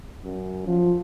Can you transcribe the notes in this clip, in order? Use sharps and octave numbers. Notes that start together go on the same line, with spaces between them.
F#2
F3